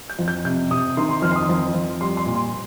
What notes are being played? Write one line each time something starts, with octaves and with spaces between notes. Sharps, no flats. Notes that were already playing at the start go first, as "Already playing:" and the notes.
G6
F2
G6
C3 G6
C3 D#6
D#3 C6
C6
F2 F6
C6
D#6
F2
F2
G3 C6
C6
A#2
C6